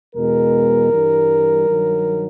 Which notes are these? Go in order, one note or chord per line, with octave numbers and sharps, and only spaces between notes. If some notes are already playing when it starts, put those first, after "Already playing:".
E2 B2 G#3 A#4
G2 E3 G3
G2 D#3 F#3